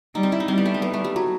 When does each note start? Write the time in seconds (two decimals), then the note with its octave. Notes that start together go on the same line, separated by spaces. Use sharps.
0.15 G3 D#4
0.23 C4
0.32 E4
0.40 D#4
0.48 G3 C4
0.58 B3
0.65 A3
0.74 C4
0.82 B3
0.94 A3
1.04 G3
1.16 F#3